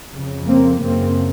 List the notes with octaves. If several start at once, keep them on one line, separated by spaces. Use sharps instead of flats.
F2 C#3
A#3 C4
F#2 C#3 A#3 C4